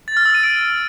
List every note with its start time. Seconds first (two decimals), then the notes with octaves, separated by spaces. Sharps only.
0.08 A6
0.17 F6
0.26 E6
0.34 D#7
0.43 D7